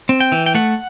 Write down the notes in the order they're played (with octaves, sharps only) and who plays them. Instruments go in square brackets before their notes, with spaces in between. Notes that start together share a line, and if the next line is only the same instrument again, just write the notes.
[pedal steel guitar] C4
G5
E3
G5
A3 F#5